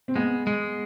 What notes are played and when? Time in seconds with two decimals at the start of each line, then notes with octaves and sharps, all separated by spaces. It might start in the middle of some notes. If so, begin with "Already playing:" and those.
0.08 C4
0.16 G#3 B3
0.47 G#3